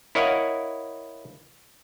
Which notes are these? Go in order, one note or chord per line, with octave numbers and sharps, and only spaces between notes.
E4 A#4 C#5 D#5 F5 F#5